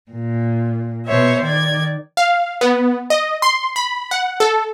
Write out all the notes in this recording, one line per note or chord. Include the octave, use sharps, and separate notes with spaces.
A#2
B2 C5 C#5 E5
D#3 D5 G#6
F5
B3
D#5
C6
B5
F#5
A4